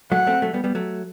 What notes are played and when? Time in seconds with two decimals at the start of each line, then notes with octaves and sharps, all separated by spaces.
0.11 F#3 A3 F#5
0.27 A3 C4
0.42 F#3 A3
0.54 G3 B3
0.64 G3 B3
0.75 F#3 A3